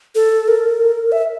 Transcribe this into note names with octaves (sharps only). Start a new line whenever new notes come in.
A4
A#4
E5